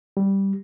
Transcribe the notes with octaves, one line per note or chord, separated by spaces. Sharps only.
G3